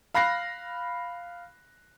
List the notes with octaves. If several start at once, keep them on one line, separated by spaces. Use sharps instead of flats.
F5 B5 F#6 A#6 C7